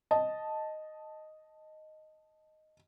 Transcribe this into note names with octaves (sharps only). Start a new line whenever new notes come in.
D#5 A5